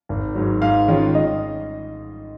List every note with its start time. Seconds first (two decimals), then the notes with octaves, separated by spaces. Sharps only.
0.09 G#1
0.35 G#2 F#3
0.62 G#2 F5
0.88 D#3 G#3 C#4 F4
1.15 D#5